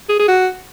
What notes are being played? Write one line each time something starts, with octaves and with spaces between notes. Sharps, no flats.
G#4
G#4
F#4